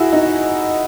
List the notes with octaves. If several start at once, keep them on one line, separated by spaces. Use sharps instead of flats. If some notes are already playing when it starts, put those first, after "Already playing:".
Already playing: E4 F#4 G#4
D#4